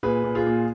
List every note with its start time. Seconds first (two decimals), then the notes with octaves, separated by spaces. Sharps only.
0.03 A#2 G#4 B4
0.24 A#2
0.35 F4 G#4
0.47 A#2